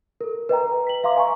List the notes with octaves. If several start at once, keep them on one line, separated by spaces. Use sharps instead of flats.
A4 A#4
B4 D#5 G5 A#5
B6 F#7
E5 F5 A#5 C6 D6
B4 D#5 G#5 A#5 C#6